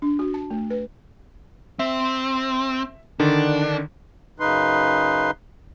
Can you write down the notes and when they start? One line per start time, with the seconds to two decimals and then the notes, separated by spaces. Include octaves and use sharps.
0.02 D4
0.19 F#4
0.34 A5
0.50 A3
0.70 B4
1.79 C4 E5
3.20 D3 D#3 D4
4.40 F#2 C#3 D#4 B4 C6